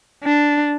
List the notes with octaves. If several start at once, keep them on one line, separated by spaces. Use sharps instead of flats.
D4